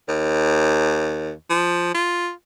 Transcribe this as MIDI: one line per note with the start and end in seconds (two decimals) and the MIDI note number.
0.09 1.32 39
1.50 1.94 53
1.95 2.31 65